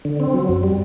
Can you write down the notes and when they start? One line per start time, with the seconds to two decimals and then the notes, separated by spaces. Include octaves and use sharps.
0.05 D3
0.20 C4
0.34 F#3
0.49 F#2
0.63 G3